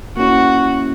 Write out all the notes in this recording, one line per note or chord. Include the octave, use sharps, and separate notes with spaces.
A#3 C#4 E4 F#4